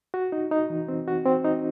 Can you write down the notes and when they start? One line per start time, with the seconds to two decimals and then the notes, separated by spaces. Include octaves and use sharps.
0.14 F#4
0.32 D#4
0.51 D#4
0.70 E3
0.88 C4
1.08 F#4
1.25 C4
1.44 D#4